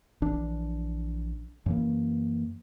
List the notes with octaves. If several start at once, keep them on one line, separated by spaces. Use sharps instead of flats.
A#1 E3 D4
F#2 E3 A#3